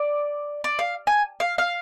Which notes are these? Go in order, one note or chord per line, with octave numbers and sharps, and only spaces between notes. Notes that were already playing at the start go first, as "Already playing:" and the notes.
Already playing: D5
D5
F5
G#5
F5
F5